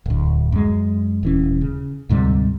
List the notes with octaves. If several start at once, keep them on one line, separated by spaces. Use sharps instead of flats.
D1 D2
F#2 G#3
D#1 E3 C#4
C#3
D2 G#2 C3 G3